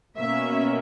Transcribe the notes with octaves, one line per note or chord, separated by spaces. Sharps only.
B2 A#3 C#4 E5